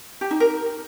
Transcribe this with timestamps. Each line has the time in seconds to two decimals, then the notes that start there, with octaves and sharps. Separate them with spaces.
0.21 G4
0.31 D#4
0.40 A#4